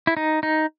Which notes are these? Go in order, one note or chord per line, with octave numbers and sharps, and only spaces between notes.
E4
D#4
D#4